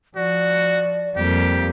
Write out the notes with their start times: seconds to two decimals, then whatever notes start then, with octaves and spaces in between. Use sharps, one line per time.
0.16 F3 F#4 D5
1.17 F2 G3 A#3 G4